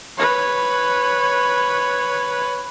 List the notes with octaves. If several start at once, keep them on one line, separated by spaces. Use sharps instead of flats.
B4 C#5